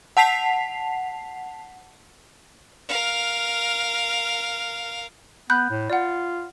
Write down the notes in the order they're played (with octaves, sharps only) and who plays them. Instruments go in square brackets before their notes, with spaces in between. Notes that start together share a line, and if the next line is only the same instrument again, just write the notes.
[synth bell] F#5 A5 B6 C7 F7
[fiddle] A#4 F5
[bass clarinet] B3 [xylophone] B5 F#6 G6
[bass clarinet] A2
[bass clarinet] F4 [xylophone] D5 F#5